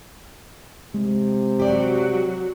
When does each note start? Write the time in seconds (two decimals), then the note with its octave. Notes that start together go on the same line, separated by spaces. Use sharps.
0.94 C3 G#3
1.60 F#3 F#4 G4 D5